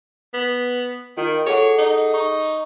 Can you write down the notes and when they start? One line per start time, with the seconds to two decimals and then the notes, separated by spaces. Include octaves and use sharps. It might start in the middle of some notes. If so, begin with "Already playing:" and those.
0.34 B3
1.17 D#3 F4
1.46 G#4 A4 C#5 F#5
1.78 D#4
2.14 D#4 C#6